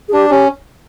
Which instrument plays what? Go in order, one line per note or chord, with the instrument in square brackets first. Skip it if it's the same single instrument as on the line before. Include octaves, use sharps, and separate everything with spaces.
[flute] G#4
[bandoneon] D4 [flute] G4
[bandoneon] C#4 [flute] G4